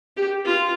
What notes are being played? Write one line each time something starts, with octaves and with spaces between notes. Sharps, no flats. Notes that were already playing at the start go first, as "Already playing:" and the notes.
G4
F4